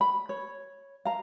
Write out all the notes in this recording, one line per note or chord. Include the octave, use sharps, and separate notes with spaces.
B5
C#5
F5 A#5